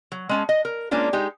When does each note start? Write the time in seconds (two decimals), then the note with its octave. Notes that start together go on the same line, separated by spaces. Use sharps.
0.12 F#3
0.29 G#3 C#4 A5
0.49 D#5
0.65 A#4
0.91 G#3 A#3 C#4 D4 F4
1.13 G#3 D#4 G4